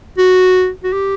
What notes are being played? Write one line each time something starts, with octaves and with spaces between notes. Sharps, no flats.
F#4
F#4
G4